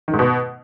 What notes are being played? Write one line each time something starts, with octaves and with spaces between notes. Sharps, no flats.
D#3
G#2
B2